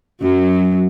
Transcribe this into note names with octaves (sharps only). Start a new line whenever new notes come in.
F#2 F#3